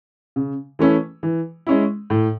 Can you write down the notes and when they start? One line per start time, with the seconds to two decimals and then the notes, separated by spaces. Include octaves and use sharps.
0.36 C#3
0.79 E3 A3 C#4 E4
1.23 E3
1.67 G#3 C#4 E4
2.10 A2